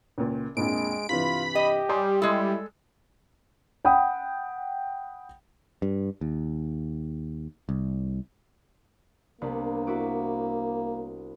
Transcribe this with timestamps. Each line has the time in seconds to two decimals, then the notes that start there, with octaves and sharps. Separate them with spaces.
0.18 C#2 A#2
0.57 A#1 F2 A#2 G#3 D7
1.09 G2 C3 E3 F4 B5
1.55 G4 D#5
1.89 G3 G#5 C6 D#6
2.22 G#3 E4 A4
3.85 F#5 G5 B5 D#6
5.82 G2
6.21 D#2
7.69 C2
9.41 C2 A#3 B3 D4
9.87 E4 F#4 D6